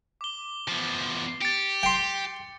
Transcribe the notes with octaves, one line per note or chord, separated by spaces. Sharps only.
D6 G7
E2 F3
G4 A6 C#7
G5 C6